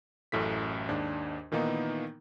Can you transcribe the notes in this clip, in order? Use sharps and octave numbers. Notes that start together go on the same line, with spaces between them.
A1 F#2 A2 A3 B6
D#2 G#2 D4
A#2 D#3 E3 A#3 B3 D#4